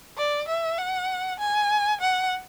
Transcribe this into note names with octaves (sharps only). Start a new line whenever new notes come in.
D5
E5
F#5
G#5
F#5